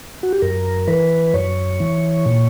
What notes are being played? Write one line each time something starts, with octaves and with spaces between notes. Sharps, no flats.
F#4
G4
F#2 A#4
E3 B4
F#2 C#5
E3
A#2